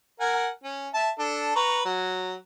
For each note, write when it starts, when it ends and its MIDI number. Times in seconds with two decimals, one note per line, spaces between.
0.20 0.48 70
0.20 0.48 78
0.20 0.48 80
0.64 0.89 61
0.94 1.10 76
0.94 1.10 81
1.19 1.51 62
1.19 1.51 69
1.56 1.80 71
1.56 1.80 82
1.56 1.80 85
1.85 2.34 54